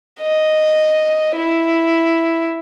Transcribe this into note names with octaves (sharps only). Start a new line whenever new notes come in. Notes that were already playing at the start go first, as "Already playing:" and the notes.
D#5
E4